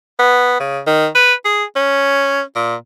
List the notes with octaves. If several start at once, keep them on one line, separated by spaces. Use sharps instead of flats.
B3
C#3
D#3
B4
G#4
C#4
A#2